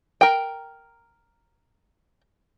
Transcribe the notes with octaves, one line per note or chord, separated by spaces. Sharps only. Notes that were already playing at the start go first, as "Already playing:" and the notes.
A#4 G5